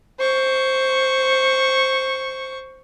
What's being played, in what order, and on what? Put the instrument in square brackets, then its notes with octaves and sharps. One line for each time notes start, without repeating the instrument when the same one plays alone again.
[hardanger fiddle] C5 C#6